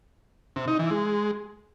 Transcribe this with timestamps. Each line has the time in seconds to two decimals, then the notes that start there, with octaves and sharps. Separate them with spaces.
0.56 C3
0.68 D#4
0.79 E3
0.91 G#3